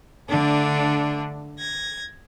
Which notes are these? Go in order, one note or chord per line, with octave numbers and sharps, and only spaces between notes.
D3 A3 D4
G#6 A#6